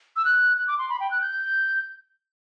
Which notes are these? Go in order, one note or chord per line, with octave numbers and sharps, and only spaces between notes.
E6
F#6
F#6
D6
C6
B5
G5
F#6
G6